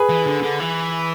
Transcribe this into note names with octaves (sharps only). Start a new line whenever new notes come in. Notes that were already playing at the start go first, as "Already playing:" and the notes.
Already playing: G#4 B4
E3
D3
D3
E3